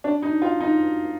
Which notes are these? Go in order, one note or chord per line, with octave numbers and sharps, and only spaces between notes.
D4
D#4
F4
D#4